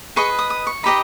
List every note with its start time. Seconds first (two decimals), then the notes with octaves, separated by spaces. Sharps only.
0.16 G#4 B4 D#5 C#6
0.39 D#6
0.50 D#6
0.67 C#6
0.83 D#4 G4 B4 D#5 B5